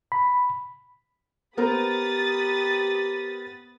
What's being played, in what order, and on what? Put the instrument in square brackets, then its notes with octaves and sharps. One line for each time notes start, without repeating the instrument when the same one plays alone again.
[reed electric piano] B5
[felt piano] B3 A#4 C5 [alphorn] G4 [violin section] B5 D#6 A6